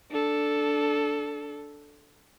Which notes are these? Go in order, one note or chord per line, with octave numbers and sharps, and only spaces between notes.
D4 A4